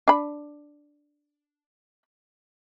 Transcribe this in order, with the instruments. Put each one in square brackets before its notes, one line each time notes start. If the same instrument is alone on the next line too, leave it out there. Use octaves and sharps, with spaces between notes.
[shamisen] D4 B5